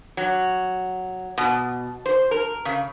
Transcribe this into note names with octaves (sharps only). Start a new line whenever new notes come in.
F#3
B2
C5
A#4
C#3